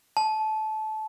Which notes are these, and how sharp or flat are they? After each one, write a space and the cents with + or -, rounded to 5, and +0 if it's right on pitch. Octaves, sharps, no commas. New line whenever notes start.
A5 -20